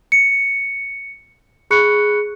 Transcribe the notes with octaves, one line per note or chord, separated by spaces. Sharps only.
C#7
G#4 B5 C#6 F#6 C#7